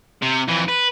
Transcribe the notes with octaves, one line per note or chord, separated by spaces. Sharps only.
C3
F2 E3
B4